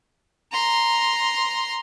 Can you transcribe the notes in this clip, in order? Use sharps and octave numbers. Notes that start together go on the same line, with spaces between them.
A#5 C6